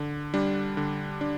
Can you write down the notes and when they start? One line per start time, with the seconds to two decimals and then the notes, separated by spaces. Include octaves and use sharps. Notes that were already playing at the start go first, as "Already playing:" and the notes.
Already playing: D3
0.34 G3 D4
0.77 D3
1.21 D4